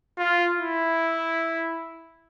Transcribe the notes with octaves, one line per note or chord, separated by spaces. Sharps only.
F4
E4